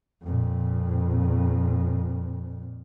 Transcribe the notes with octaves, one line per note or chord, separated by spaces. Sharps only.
F2 A#2